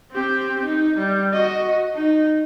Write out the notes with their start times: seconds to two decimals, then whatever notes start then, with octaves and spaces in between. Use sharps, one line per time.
0.11 C4 G4
0.65 D#4
0.98 G3
1.33 F#4 D#5
1.95 D#4